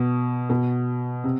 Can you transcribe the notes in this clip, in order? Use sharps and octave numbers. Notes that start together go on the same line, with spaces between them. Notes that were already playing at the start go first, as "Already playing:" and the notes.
Already playing: B2
B2
C3